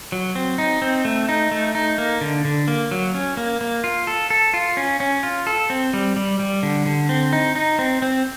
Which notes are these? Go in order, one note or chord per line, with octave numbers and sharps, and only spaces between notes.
F#3
C4
D#4
C4
A3
D#4
A3
D#4
A#3
D3
D3
A#3
F#3
C#4
A#3
A#3
F4
A4
A4
F4
C#4
C#4
F4
A4
C4
G3
G3
G3
D3
D3
C4
D#4
D#4
C4
C4